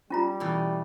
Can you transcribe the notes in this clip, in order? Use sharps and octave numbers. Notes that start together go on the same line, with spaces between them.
G3 C#4 F4 A#5
B2 E3 A3